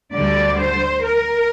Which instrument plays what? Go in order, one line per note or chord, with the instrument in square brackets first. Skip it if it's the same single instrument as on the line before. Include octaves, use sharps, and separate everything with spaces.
[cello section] D2 D3 G3 D5
C5
A#4